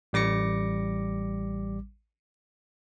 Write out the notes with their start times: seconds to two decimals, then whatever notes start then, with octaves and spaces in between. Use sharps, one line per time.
0.13 A1 G3 D6 A#6 C#7